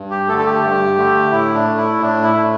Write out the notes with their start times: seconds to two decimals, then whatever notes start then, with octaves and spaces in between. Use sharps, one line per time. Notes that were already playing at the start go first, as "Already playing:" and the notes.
Already playing: G2
0.11 G4
0.28 A3 A4
0.32 D3
0.38 A4
0.46 G4
0.63 G2
0.97 D3 A3
1.32 A2 E4
1.54 D4
1.66 A3
1.78 E4
2.01 A2 D4
2.24 E4
2.35 A3